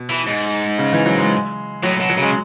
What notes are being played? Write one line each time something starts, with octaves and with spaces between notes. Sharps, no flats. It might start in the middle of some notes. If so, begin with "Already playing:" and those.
Already playing: B2
E3
G#2
C#3
E3
F#3
G#3
A2 F#3
B2
F#3
C#3 G#3